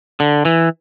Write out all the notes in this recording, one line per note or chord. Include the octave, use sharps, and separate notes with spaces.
D3
E3